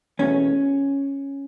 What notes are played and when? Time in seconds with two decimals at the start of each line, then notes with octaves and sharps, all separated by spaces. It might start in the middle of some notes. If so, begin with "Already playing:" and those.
0.19 E2 B2 A3 C#4